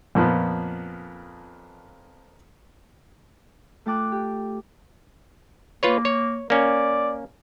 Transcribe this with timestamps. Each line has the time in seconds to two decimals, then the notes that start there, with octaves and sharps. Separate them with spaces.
0.15 F2 A#2 F3 B3
3.86 A3 F4 G5 A5 D6 F#6
4.12 G4
5.83 A#3 F4 B4 C#5
6.05 C#5
6.50 A#3 C#4 D5